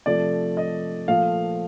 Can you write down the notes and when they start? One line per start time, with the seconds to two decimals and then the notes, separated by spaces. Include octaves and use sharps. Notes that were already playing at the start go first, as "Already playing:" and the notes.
0.06 C3 F3 A3 D5
0.57 D#5
1.08 A#2 F3 A3 F5